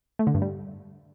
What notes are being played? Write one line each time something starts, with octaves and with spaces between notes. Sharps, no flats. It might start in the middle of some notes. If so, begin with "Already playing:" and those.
A3
D3
G2
G3